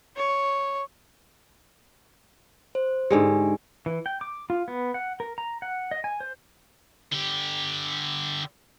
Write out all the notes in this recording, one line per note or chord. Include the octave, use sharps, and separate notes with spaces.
C#5
C5
G#2 D3 G#3 G4 G#5
E3
G5
D6
F4
B3
F#5
A#4
A#5
F#5
D#5
G#5
C5
D3 G4